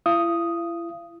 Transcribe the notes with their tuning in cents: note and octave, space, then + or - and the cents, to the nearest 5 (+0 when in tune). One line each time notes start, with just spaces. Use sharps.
E4 +40 F5 -35 D#6 +0